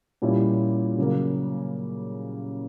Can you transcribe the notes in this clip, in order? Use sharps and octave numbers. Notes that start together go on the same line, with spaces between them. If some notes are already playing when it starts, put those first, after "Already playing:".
A#2 G3 A#3 C#4 E4
C#3 F#3 A#3